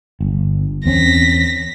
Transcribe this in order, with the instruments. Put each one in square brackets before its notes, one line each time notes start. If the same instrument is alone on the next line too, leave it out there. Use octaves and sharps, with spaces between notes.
[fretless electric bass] G1
[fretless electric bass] E2 C4 C#4 [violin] A#6 B6